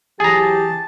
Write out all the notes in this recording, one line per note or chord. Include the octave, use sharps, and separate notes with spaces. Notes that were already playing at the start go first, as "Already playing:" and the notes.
E3 F#3 G4 G#4 A5 A#5